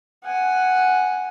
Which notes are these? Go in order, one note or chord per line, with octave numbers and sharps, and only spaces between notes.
F#5 G#5